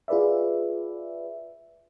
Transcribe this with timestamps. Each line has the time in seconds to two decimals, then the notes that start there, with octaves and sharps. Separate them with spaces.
0.08 F4 G#4 B4 D5 E5